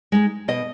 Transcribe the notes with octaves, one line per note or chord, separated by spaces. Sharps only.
G#3 D#4
B2 D#5